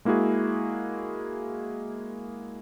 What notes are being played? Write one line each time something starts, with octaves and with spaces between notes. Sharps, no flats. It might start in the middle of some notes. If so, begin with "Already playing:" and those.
G#3 A#3 E4 F#4 G#4